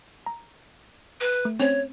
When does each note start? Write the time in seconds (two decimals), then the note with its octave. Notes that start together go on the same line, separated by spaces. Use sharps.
0.26 A#5
1.21 B4
1.45 A3
1.60 C4 C#4 C5 C#5